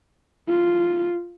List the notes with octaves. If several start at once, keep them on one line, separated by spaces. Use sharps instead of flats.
F4